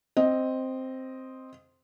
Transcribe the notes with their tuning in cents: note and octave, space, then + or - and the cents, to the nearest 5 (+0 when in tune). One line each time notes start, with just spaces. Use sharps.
C4 +0 D#5 +0